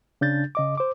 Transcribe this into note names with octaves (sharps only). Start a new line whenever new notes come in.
C#3 D4 G6 A6
C#3 D#5 D6
C5 D6